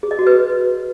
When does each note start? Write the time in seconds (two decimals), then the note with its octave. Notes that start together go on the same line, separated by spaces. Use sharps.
0.03 G#4
0.11 D#5
0.19 F#4
0.27 B4